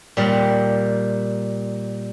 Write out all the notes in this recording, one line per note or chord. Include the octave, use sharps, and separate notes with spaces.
A#2 G3